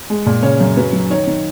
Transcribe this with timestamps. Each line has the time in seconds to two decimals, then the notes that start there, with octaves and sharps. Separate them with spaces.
0.10 G#3
0.26 A#2
0.42 C#3 C#5
0.60 F#2
0.77 F#3 B4
0.93 F#3
1.10 D#3 C#5
1.27 D#3